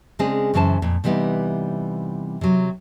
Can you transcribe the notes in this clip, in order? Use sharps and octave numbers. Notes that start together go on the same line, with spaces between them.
C#3 G#3 C4 D4 G#4
F#2 C#3 E3 C5 A5
F2 A#2
C3 E3 G3 B3 D#4
C3 F#3